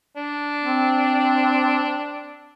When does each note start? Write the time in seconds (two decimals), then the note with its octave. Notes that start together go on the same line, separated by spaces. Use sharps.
0.16 D4
0.63 C4